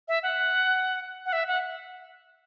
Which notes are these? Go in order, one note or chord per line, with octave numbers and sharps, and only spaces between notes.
E5
F#5
F#5
E5
F#5